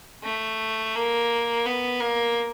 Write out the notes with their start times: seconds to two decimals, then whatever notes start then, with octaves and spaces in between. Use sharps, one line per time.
0.23 A3
0.94 A#3
1.66 B3
2.00 A#3